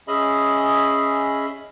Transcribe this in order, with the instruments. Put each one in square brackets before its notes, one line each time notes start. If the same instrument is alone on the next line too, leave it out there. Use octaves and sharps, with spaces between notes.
[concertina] C#4 G#4 D#5 E5 B5